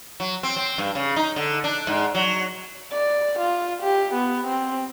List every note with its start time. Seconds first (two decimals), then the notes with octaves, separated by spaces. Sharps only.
0.20 F#3
0.43 C4
0.56 C4
0.78 G2
0.95 C#3
1.16 D#4
1.36 D3
1.64 D4
1.87 G#2
2.15 F#3
2.92 D5
3.39 F4
3.82 G4
4.14 B3
4.47 C4